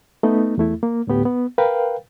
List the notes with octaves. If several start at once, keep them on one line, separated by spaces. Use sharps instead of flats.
A3 B3 D#4
E2 A3 E4
A#3
D2 A2 B3 G4
B3
A#4 B4 F5 G5